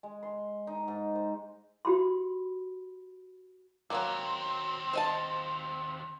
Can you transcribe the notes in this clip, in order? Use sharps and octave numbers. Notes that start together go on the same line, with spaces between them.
G#3
C6
D#4
G#2
C5
F#4 G4 B5 C6
D#2 F#3 G#3 A#3 C4
C5 D#5 A5